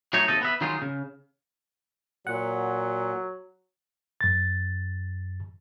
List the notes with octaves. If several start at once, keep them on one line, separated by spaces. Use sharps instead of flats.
F#3 A3 D#4 C#5
D#2 C3 A4 D#5
B3 B4 E5
D#3 F#3 G#3 D#4 F4
C#3
A#2 F#3 F#5
F#2 A6